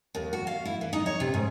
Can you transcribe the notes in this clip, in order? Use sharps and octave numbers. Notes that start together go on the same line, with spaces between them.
D#2
F#4
F5
E4
E3
D#4
C#5
C3
G#2